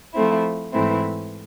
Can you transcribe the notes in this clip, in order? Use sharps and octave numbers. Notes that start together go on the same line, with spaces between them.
F3 A3 C4 E4
G#2 E3 A3 C4 E4